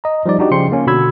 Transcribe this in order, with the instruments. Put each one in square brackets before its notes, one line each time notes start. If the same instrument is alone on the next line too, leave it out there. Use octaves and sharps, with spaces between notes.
[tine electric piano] D#5 A#5
F3 G3 D#4 D5
D4 D#4 F#4 G4 D5
C#3 F3 G5 C6 C#7
A#3 C#4
B2 D3 F#4 B5 E6 G#6